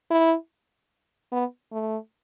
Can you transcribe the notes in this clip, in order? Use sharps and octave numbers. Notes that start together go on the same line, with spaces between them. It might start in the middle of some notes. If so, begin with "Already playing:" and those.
E4
B3
A3